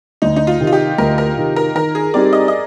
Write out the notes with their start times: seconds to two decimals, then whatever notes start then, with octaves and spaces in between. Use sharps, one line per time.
0.22 D2 D#4
0.36 D#4
0.47 F4
0.60 C3 D#3
0.67 F4
0.73 G4
0.98 D2 A#4
1.18 A#4
1.37 C3 D#3
1.56 A#4
1.75 D#3 A#4
1.95 G#4
2.14 G3 C4 D#4 G4 D5
2.33 D#5
2.48 D#5